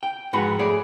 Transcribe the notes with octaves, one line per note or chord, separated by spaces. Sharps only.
G5
F2 G#2 F#4 B4 F#5 B5
A3 G#4 C#5 D5